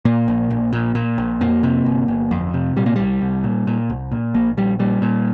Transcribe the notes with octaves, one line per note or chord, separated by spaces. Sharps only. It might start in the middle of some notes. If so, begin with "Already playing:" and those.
A#2 A#3
A#1
A#1
A#2
A#2
A#1
F2 A#3
C3
G1
G1
F2
C3
A#2 G3
A#3
C2 G3
C2
A#2
A#2
C2
A#2
A#1 A#3
A#1 G3
A#2 G3
A#2